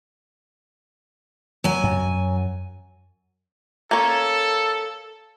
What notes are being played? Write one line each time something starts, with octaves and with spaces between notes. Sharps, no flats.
F#3 G#5
F#2
A#3 C#4 A4